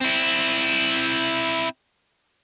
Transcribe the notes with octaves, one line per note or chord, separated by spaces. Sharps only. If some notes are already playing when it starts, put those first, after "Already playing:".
C4 E4